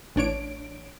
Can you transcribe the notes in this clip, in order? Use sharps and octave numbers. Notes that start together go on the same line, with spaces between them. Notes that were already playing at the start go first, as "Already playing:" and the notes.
A1 D4 C#5 D7